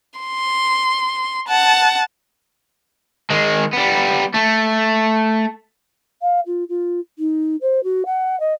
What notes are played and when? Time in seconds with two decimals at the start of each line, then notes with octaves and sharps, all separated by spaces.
0.19 C6
1.48 F#5 A5
3.30 D#3 G#3
3.73 G3 B3
4.34 A3
6.22 F5
6.46 F4
6.69 F4
7.18 D#4
7.61 C5
7.83 F#4
8.06 F#5
8.40 D#5